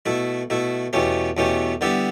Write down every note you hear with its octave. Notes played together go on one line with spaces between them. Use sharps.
B2 A3 E4
B2 A3 E4
E2 B2 A3 C#4 G4
E2 B2 A3 C#4 G4
D3 G3 B3 E4 G4